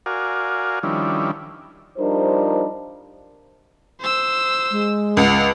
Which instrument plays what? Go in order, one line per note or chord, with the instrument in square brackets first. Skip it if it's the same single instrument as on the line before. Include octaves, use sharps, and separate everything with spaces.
[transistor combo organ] F#4 A#4 D5 F5 G#5
D#3 F3 G3 C#4 D4 E4
[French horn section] F3 G3 D4 D#4 A#4 C5
[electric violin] C5 E6
[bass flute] G#3
[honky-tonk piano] C#2 [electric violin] F#5 F6